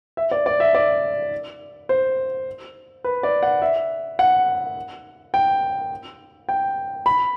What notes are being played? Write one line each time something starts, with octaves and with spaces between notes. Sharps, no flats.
E5
D5
D5
E5
D5
C5
B4
D5
F#5
E5
F#5
G5
G5
B5